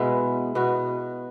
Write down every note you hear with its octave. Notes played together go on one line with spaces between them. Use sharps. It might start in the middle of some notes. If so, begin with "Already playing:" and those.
Already playing: B2 G#3 B3 E4
B2 B3 F#4